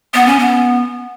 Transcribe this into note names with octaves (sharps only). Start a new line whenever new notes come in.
B3
C#4
B3